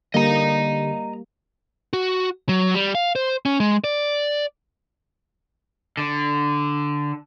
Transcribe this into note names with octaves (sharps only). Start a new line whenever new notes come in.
D3 G3 A#3 G4 D#5 A#5
F#4
F#3
G3
F5
C5
C#4
G#3
D5
D3